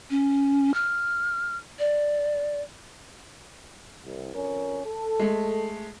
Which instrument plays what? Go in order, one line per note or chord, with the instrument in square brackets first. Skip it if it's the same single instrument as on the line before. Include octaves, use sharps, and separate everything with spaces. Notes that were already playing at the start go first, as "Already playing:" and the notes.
[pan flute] C#4
F6
D5
[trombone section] C2
F2 C#4 A#4
A4
[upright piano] G#3 A3